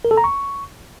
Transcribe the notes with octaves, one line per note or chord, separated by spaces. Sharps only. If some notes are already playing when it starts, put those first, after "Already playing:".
A#4
A4
A#5
C#6